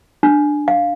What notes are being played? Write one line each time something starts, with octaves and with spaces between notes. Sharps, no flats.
D4
F5